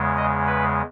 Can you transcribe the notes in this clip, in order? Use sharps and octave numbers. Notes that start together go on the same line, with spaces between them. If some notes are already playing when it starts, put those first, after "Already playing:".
Already playing: E2 C#3 G#3
D#5
B4